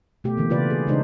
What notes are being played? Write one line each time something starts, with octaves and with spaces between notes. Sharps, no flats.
B2 A3 G4
D3 E3 A#3
C#3 F4 B4 D5
G#4
C#3 G#3 D4 D#4 C5